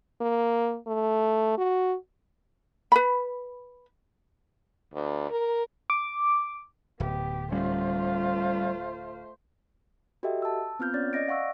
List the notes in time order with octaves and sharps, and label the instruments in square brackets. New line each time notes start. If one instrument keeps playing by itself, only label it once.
[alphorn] A#3
A3
F#4
[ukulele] B4 B5
[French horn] D2
A#4
[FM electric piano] D6
[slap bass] D1 [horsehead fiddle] B3 G4
[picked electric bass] G3 C#4 [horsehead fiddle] A3 C5 [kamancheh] F4
[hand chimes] F#4 G4 A4 D#5 E5 G5
A5 E6
B3 C4 F4 F6 G6
C#4 C#5 D5 A6
D5 D#5 A#6 D7
F5 F#5 C#6 E6